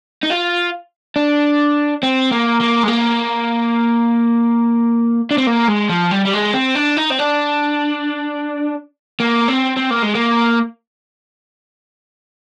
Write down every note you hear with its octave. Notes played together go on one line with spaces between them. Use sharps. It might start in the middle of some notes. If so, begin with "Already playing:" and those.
D#4
F4
D4
C4
A#3
A#3
G#3
A#3
D4
C4
A#3
G#3
F3
G3
G3
G#3
C4
D4
D#4
C4
D4
A#3
C4
C4
A#3
G#3
A#3